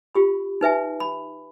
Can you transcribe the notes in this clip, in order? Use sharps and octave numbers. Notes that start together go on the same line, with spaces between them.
F4 G4 B5
D#4 B4 E5 G#5
B5